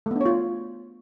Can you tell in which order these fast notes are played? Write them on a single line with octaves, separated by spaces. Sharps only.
A3 B3 D4 C#5 F4